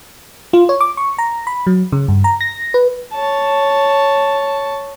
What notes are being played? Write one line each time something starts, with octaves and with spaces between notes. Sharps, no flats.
F4
C#5
D6
C#6
A#5
B5
F#3
C#3
G2
A#5
A#6
B4
C#5 A5